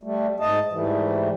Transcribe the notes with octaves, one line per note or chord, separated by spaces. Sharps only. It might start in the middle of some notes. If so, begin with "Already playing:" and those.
G3 A3
G#2 D#5 A5
G#2 E3 G3 A3